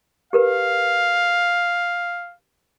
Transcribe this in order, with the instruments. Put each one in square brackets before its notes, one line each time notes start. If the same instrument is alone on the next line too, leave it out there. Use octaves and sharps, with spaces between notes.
[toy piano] G4 A#4 B4 [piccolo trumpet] F5